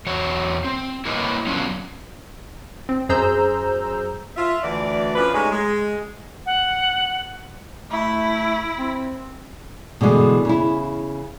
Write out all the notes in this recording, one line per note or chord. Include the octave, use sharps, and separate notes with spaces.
E2 F#4 C#5
C4
A#3 E4 A#4 B4 C#5 D#5
F#3 B3 C#4 D4 F4
C4
F#2 G#4 C5 A#5 E6 G6
F4 E5
D2 E3 D5
F3 C#4 D4 B4
G#3 A3 C#4 D#4 G4 G#4
G#3
F#5
A3 E4
C4
B2 D3 E3 G#3
C#3 E4